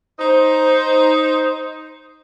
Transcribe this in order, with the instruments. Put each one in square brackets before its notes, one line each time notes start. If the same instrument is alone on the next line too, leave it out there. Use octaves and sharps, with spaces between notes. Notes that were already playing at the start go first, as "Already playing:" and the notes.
[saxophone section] D#4 C5